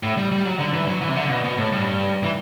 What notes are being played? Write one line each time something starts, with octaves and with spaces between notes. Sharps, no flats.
A2
G3
G3
F#3
D3
E3
F#3
E3
C3
D3
B2
B2
A2
G2
E3